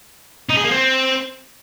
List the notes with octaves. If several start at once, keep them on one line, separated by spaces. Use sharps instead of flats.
D#4
G#4
A#3
C4